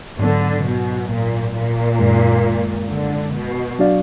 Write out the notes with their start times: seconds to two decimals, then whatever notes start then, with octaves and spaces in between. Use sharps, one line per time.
0.19 G#2 D3 F#3 B3
0.64 B2
1.09 A#2
1.55 A#2
1.99 F#2 D#3 G#3
2.89 D3
3.35 B2
3.79 F#3 D4 F#4 D5 F5